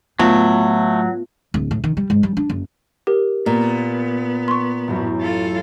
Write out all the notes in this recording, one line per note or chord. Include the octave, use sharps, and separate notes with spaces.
A2 F#3 A3 B3 F4
D1
A2
D#3
G3
G#2
G3
D4
F#1
G4 A#4
A#2 B3
C6 C#6
A1 F#2
F4 A4